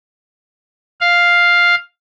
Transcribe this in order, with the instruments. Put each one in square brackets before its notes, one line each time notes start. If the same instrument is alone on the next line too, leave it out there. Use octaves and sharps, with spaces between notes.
[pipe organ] F5